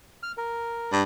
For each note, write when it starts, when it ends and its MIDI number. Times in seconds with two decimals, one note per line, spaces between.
0.23 0.32 89
0.37 0.91 70
0.92 1.03 43